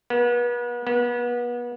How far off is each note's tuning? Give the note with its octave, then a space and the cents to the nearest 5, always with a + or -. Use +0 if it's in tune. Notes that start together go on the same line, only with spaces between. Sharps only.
B3 -40
B3 -35